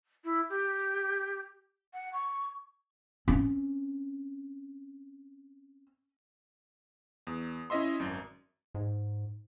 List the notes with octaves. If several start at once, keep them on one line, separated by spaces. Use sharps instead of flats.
E4
G4
F#5
C#6
C4 C#4
E2 D#6
C#4 E4 D#5 E5 C6
G#1 F#2
G#2